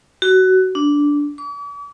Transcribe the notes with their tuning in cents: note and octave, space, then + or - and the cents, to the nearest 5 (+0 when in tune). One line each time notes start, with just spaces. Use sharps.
F#4 +20
D4 -10
D6 -45